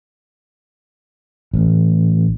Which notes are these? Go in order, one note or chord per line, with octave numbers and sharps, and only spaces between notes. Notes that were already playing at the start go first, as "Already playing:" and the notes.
A1